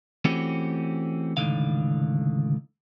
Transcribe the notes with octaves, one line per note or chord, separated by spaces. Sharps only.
E3 A3 C4 C#4 F#4 G4
C#2 A2 D3 D#3 F5